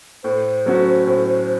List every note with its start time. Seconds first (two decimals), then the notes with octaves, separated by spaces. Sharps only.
0.24 A2 C5
0.66 F#3 A3 C#4 F#4
1.07 A2